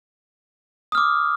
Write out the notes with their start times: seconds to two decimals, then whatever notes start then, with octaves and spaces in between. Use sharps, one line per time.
0.92 D#6
0.95 F6
0.98 D6